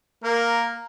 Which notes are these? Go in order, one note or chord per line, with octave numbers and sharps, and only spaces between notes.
A#3 A#4